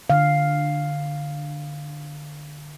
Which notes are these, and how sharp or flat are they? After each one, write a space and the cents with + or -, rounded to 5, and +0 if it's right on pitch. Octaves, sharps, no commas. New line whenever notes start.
D3 +15 F5 +0